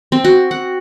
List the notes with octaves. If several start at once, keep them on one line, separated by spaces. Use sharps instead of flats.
C4
F#4
F#5